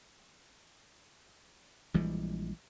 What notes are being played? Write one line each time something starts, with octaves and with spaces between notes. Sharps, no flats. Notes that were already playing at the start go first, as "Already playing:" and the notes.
A#1 E3 G3 G#3